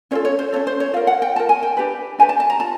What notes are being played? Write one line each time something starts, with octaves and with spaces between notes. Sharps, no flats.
C#4 F4 A4 C#5
C#5
C5
C#4 F4 A4 C#5
C5
C#5
F4 A#4 F5
F#5
G5
F4 A#4 A5
G#5
G5
D4 G4 B4
D4 G4 B4 G#5
A5
A5
A#5
F4 A5